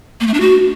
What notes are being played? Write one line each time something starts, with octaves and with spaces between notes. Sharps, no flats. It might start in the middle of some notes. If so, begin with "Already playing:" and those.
A#3
A3
D4
F#4